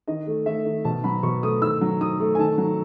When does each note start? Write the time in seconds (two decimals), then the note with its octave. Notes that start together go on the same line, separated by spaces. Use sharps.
0.07 D#3 D#5
0.27 A3
0.46 A3 E5
0.66 D#3
0.84 B2 A5
1.04 F#3 B5
1.23 B2 C#6
1.43 A3 D#6
1.62 D#3 E6
1.81 F#3
2.01 D#3 D#6
2.20 A3
2.35 G#5
2.39 D#3 A5
2.58 F#3